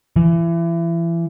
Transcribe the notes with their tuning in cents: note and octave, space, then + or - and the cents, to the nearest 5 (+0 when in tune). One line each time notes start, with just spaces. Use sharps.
E3 +30